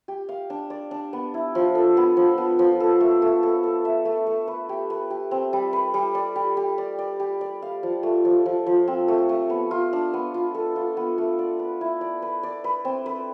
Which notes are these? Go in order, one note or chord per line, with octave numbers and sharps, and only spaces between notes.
G4
F5
D4
D5
D4
B3
E4
F3
A4
B3
F3
B3
F3
A4
A3
A3
A4
A4
E5
A3
A3
B4
G4
B4
G4
C4
G3
B4
G3
D5
G4
G4
D5
D5
G4
D5
F5
F3
A3
F3
F3
F3
C4
A3
A3
B3
F4
D4
B3
F4
A4
F4
B3
A3
D5
B4
E4
D5
B4
D5
B4
C4
B4